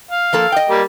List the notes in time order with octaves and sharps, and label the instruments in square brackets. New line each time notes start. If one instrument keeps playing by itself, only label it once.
[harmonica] F5
[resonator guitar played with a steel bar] F3 A#3 A4
D#5 G5
[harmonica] G3 A#3